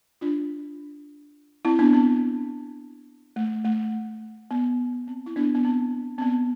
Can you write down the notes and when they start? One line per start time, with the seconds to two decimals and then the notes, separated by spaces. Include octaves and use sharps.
0.21 D4 F4
1.65 C4 E4
1.79 B3 D4
1.93 C4
3.36 A3
3.65 A3
4.51 B3
5.08 C4
5.26 E4
5.36 B3 D4
5.55 B3
5.65 C4
6.18 C4
6.22 B3